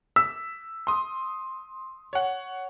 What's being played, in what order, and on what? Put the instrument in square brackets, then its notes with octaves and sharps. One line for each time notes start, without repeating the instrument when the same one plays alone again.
[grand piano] E6 [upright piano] B6
[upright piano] C6 D#6
C#5 F#5